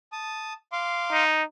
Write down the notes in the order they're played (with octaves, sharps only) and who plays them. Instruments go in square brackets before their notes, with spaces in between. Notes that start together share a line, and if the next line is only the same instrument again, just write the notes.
[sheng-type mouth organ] A5 D#6
F5 C6 D6
[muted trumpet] D#4